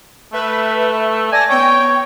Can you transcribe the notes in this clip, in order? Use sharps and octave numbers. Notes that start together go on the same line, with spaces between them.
A3 B4 E5
D5 G#5 A5 A#6
B3 C#5 G5